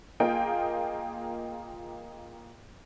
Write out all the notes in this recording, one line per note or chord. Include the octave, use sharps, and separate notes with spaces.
A#3 F4 G#4 D#5 G5